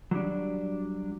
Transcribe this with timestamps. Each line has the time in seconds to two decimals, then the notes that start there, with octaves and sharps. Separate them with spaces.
0.11 F#3 G3 D4